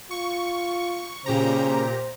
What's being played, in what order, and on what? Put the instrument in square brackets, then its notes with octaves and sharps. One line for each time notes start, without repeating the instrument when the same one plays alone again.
[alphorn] F4 [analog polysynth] C#6
[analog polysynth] A#2 G4 A#5 [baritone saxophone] C#3 [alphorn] C5